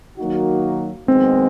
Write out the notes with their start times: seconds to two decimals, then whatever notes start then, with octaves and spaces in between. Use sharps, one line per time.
0.18 D#3 F#3 A#3 D#4 F#4
1.07 F#2 D#3 G#3 B3 C4